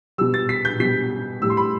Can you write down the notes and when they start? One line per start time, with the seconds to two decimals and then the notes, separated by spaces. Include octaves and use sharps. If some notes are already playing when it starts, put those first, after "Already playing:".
0.18 B2 G3 E6
0.34 A6
0.49 B6
0.65 G6
0.80 B2 G3 B6
1.42 A2 G3 E6
1.50 C6
1.57 B5